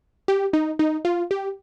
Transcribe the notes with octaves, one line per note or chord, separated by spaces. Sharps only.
G4
D#4
D#4
F4
G4